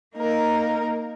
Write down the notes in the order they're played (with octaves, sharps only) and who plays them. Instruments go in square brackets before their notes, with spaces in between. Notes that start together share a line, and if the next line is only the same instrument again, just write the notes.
[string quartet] A#3 D#4 A#4